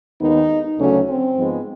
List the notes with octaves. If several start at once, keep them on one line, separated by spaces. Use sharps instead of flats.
D#2 D#3 G#3 B3 D#4
D2 C#3 F#3 A3 C#4
C4
G#2 F3 G#3 B3